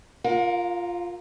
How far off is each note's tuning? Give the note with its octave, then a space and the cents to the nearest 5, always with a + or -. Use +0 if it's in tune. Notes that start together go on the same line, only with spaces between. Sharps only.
F4 +0 A#4 +0 F5 +40